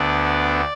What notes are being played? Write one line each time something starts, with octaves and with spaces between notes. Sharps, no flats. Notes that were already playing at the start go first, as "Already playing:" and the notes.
Already playing: D2 D3 B3 D5